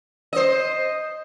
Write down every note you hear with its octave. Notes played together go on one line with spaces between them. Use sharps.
C5 D#5